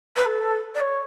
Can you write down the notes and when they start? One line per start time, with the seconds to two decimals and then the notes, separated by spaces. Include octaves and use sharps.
0.16 B4
0.25 A4
0.75 D5
0.80 C#5